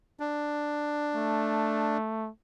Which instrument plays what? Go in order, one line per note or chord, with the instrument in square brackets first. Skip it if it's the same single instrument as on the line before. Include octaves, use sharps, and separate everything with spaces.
[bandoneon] D4
[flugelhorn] A3